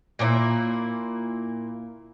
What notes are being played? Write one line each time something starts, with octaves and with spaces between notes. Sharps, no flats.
A#2 A#3 D4 E4